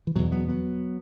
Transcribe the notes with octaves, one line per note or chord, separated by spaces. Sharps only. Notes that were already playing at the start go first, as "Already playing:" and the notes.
E3
E2 B2 F#3
F#3 B3
F#3 B3